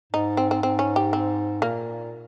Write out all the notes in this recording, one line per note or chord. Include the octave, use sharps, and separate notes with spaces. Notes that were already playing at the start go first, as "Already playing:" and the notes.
G#2 D#4
C4
C4
G#2 C4
C#4
G4
C4
A#2 A#3